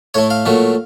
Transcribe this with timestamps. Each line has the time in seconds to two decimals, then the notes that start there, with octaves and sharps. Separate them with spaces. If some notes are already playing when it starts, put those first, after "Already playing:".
0.14 A2 A3 C#5
0.30 F5
0.46 A#2 F#3 A3